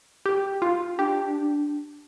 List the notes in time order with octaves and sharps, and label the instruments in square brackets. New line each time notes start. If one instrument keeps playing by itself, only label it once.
[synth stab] G4
F4
[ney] D4 [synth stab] G4